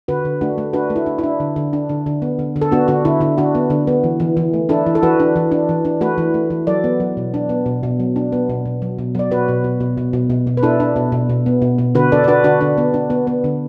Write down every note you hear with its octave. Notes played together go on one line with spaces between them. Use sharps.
D3 F#4 B4
D3
A3 D4 F#4
A3
D4 F#4 B4
A3
E4
D4
E4
D4
D3
D3
D4
D3
D3
B3
D3
D3
A4
B3 D4 F#4
D3 D4 F#4
D3 E4
D3 E4
D3 D4 F#4
B3
D3
B3
E3
E3
E3
A3
D4 E4 A4
E3
A4
E3 F#4 B4
D4
E3
D4
E3
D4
A3 F#4 B4
E3
A3
E3
F#3 A4 D5
B3
F#3
B2
D4
B3
B2
B2
F#3
D4
B3
B2
B2
F#3
B2
F#3 D5
B2 F#4 B4
B2
B2
B2
B2
B2
B2
B2
B4
D4 E4 A4
D4
B2
B2
B2
B3
B2
B2
D3 F#4 B4
D4 A4 D5
D5
D4 F#4 B4
D3 D4 F#4
D3 D4
B3
D4
B3
B3
D3